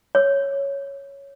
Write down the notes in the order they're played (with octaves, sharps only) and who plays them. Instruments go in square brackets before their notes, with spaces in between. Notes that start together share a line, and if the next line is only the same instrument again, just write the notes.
[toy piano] C#5